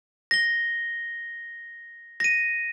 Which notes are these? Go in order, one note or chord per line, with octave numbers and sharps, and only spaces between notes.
A#6 G7
A#6 D#7